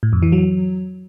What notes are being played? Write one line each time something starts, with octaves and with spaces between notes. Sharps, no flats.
A2
F2
E3
F#3